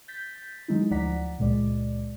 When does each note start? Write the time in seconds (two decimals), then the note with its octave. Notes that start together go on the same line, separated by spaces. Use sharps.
0.08 G6 A6 B6
0.68 D3 F#3 G#3 D#4 E4
0.91 D2 F3 D5 F#5 A#5 B6
1.38 C#2 A#2 G#3 D5